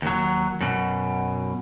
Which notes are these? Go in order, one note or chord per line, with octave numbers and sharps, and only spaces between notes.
D#2 F#3
F#2 B2